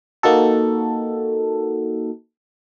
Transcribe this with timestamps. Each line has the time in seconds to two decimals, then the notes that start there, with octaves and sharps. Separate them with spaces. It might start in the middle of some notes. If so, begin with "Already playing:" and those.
0.23 A#3 D#4 F#4 A4